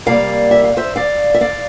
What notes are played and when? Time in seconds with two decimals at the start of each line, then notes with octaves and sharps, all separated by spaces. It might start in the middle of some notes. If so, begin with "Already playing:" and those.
0.06 C3 G3 A#3 D5 F5
0.51 E5
0.64 F5
0.77 C5 E5
0.96 D5 F5
1.34 E5
1.41 D5 F5